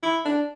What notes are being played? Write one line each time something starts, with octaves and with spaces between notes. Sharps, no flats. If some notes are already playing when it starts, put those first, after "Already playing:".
E4
D4